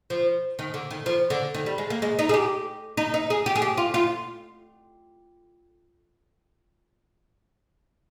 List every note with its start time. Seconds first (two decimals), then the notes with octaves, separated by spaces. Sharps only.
0.10 F3
0.59 D#3
0.74 D3
0.91 D#3
1.06 F3
1.30 D3
1.54 D#3
1.66 G3
1.78 G#3
1.90 A#3
2.02 G#3
2.19 D#4
2.29 G#4
2.34 G4
2.97 D#4
3.14 D#4
3.30 G#4
3.46 G4
3.56 G#4
3.62 G4
3.78 F4
3.94 F4